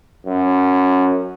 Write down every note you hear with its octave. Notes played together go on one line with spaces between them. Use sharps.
F#2